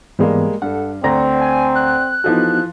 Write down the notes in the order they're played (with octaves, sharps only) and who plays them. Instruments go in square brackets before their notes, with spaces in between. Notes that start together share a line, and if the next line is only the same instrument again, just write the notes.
[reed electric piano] G#2 E3 B3 [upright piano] G3 G#3 A#3
[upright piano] G2 [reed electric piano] A4 F#5
[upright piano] D2 A#5 A#6 [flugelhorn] C4 [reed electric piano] D5 F#5
[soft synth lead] G#5
F#6
[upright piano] E3 F3 A4 [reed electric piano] B3 D#4 F#4